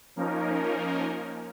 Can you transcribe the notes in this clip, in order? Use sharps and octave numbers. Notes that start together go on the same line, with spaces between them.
F3 A#3 C#4 D#4 A#4